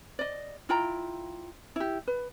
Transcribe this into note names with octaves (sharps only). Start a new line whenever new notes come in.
D5 D#5
E4 F4 G5 A#5
E4 G4
B4